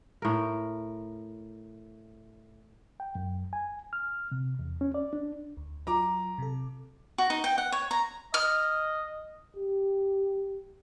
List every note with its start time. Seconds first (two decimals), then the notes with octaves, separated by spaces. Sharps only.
0.22 A2 A#4
3.00 G5
3.15 F#2
3.53 G#5
3.93 F6
4.32 C3
4.59 E2
4.81 C#4
4.94 D5
5.13 D4
5.57 D2
5.87 F#3 F4 A#5 D6
6.38 C3 A4
7.18 F#4
7.30 D#4
7.44 G5
7.58 F#5
7.72 C#5
7.91 A#5
8.34 D#5 F6
9.56 G4